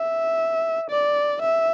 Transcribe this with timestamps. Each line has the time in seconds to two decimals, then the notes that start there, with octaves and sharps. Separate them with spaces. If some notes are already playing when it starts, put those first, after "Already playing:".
Already playing: E5
0.90 D5
1.42 E5